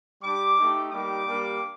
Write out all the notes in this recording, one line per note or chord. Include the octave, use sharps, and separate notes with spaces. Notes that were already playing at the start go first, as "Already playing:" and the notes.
G3 D4 G4 D6
A3 D#4 G4
G3 A#3 D#4 G4 D6
G3 A#3 D4 G4